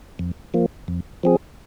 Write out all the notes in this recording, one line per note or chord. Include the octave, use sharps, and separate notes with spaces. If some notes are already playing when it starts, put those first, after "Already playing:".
F2
F3 A#3
F2
F3 C4 G#4